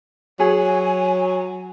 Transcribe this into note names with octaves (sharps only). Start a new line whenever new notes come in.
F#3 G#4 G#5